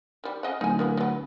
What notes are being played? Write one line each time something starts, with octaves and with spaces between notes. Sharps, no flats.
D#3 G3
C#3 D#5 F#5
D1 D#4 G#5
A#3 B3 E4
F#3 B3